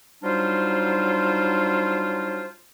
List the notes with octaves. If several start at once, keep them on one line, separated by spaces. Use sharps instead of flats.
F#3 G3 D4 D#4 F4 C5